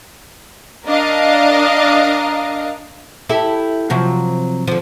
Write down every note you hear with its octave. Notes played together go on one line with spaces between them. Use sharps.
D4 A#4 D#5 F5
E4 G4 A4
C3 F3 F#3
D3 F3